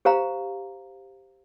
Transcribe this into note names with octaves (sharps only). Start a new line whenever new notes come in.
G4 C5 F5 A#5